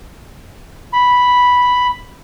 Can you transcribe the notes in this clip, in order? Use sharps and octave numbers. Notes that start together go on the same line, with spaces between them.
B5